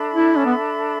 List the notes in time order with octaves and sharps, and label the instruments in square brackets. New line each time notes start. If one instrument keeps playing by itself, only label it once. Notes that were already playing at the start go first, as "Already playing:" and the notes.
Already playing: [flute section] D4 A4 E5 B5
[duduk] E4
C#4
B3